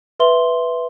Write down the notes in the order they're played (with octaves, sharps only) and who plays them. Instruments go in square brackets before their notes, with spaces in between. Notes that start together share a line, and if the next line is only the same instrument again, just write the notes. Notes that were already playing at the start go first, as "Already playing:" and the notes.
[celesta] B4 E5 C6 G7